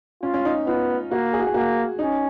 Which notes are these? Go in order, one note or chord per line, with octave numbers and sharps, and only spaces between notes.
C#4 F4
C#4
D#4
B3 F4
A#3 F#4
G#4
F#4
G#4
A#3 F#4
C#4 D#4